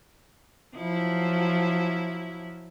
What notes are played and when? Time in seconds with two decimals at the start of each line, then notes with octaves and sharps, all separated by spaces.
0.76 F3 F#3 E4